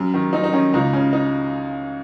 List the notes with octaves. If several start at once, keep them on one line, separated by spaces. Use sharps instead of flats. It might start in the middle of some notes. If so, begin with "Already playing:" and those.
Already playing: F#2
D#3
F#2 D#4
D#4
D#3 C#4
C#2 D#4
C#3 C#4
D#4